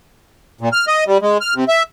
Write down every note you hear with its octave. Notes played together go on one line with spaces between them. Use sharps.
A#2
F6
D#5
G3
G#3
F6
C3
E5